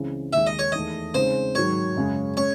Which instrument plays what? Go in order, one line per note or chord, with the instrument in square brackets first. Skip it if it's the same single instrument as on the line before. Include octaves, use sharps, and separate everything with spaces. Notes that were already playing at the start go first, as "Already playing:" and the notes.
Already playing: [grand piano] C#2 C#3 E3 C4
[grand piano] D#2 D#3 G#3 [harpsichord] E5
[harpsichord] D#5
C#5
[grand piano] E2 D#3 A3 [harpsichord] D#5
[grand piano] C#3 G#3 C4 D#4 [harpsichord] C5
[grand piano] G#2 D#3 F#3 [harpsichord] C#5
[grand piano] F#2 C#3 G#3
[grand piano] G#3 C#4 [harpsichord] C#5